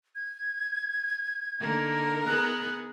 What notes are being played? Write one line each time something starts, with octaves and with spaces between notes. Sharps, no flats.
G#6
D3 A#3 D#4 A#4
B3 G#4 F#6